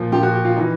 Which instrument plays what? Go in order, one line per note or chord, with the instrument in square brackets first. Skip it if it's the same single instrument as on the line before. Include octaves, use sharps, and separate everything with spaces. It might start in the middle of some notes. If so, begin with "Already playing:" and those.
Already playing: [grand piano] A#2 F3
A#2 F3 G4
F#4
G4
F4
E3 D#4